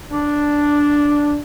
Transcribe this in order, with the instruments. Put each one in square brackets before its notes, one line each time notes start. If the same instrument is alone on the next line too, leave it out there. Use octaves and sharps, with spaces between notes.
[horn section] D4